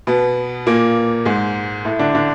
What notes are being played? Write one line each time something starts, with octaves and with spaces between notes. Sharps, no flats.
B2 B3
A#2 A#3
G#2 G#3
A2 A3
D3 D4
D3 D4